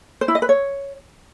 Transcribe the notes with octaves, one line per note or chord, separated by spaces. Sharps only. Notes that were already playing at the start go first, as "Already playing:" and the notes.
C5
E4
D#5
B4
C#5